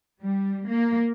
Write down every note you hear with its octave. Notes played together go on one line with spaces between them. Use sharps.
G3
A#3